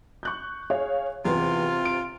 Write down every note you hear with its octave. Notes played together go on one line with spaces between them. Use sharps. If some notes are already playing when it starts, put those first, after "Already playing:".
C#6 F#6 G6
G#4 C#5 F5
E2 C3 F4 B4
D7